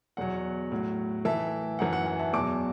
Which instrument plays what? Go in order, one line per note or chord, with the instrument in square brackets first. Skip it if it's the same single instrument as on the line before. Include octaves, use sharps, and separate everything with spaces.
[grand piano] E2 B2 F#3 F#5
A2 F#3
A2 E3 E5 A5
F#2 E3 F#5
F#5
F#5
E5 A5
E2 B2 F#3 A5 D6